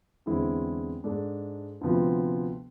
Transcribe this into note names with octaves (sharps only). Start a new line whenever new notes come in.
E2 D3 G#3 C4 E4
G#2 G#3 D4 A4
D2 C3 F3 B3